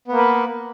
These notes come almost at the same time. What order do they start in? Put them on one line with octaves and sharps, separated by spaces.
B3 A#3 B4